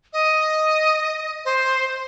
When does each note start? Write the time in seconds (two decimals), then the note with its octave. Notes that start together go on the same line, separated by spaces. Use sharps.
0.13 D#5
1.45 C5